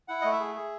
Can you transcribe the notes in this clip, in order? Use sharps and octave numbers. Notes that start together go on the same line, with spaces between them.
E4 F#5
A3 D#5
E5
G#4
G#4